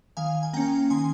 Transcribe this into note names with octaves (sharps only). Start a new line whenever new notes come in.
D#3 F5 G#5
G#5
A#3 C#4 G5 A#5
D#3 G#5 C6